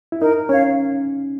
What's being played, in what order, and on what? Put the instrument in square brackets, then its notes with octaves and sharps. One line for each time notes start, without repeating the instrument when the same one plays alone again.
[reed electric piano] E4
[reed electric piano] D#4 [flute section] A#4
[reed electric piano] C#4 [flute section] C#5
[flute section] F5